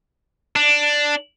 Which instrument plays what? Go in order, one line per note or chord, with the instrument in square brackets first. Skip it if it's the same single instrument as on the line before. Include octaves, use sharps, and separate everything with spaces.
[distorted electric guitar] D4